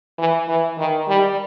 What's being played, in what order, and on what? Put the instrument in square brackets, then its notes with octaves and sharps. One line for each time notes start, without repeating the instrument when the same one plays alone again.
[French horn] E3
E3
D#3
G3